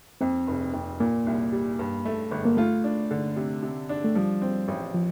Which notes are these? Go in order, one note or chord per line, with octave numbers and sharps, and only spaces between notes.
F2 C4
F1
F2
A#2 A#3
C2
G3
G2
A3
G1
A#3
A3 F4
D4
D3
C3
C3
D4
A3
F3 G3
C4
A1
F3